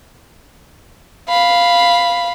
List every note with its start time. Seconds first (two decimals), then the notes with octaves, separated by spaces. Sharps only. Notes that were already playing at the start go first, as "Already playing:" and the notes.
1.29 F5 B5